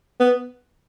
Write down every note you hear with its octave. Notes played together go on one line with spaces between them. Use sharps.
B3